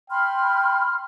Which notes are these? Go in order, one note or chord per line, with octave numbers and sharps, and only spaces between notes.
G5 B5 C6 F6